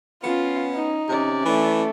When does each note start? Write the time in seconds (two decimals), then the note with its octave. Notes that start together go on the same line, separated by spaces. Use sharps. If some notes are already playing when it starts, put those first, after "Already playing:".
0.24 B3 C#4 F4
0.75 D#4
1.08 C3 C#4 D5
1.45 E3 A3